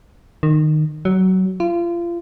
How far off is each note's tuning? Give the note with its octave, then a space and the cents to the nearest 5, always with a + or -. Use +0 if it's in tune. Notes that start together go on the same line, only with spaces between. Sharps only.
D#3 -20
F#3 +20
F4 -30